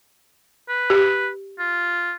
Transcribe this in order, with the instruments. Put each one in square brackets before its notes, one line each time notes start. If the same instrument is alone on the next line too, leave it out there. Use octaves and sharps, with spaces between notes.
[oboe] B4
[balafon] G4
[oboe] F4